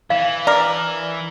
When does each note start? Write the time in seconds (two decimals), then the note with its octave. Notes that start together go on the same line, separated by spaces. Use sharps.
0.10 E3 F5
0.47 A#4 D5